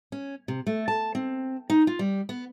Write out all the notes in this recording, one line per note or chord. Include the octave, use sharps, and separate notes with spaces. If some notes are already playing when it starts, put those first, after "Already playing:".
C#4
C3
A3
A5
C4
D#4
F4
G3
B3